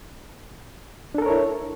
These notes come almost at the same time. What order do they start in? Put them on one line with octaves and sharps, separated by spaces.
D4 A4 A#4 C#5 E4